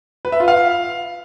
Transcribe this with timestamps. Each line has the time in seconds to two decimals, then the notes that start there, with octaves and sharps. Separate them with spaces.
0.25 B4
0.32 E5
0.40 F4
0.48 F5